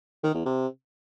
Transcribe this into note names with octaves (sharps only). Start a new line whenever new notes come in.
D#3
E2
C3